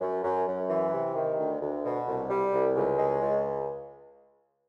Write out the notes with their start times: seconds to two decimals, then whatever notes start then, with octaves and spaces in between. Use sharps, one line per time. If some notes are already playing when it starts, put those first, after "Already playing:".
0.01 F#2
0.24 F#2
0.48 F#2
0.70 E3
0.93 C3
1.15 D#3
1.38 D2
1.61 D2
1.84 B2
2.07 C2
2.30 G3
2.53 C2
2.76 C#2
2.98 G#3
3.21 C#2